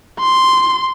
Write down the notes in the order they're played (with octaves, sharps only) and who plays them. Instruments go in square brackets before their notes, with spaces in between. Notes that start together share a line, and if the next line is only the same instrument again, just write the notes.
[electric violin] C6